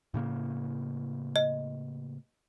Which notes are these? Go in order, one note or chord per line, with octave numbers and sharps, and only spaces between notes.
A2 C#3 A#3
D#5